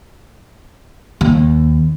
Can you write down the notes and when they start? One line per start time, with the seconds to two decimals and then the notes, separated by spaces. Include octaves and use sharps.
1.21 D#2